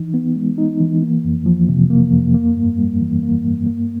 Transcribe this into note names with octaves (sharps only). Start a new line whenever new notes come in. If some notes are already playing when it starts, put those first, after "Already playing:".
Already playing: E3 D#4
B3
G#3
D#4
E3
A#3
F2
F3
C3
A#3
F2
A#3
G2
G3
E3
A#3
G2
A#3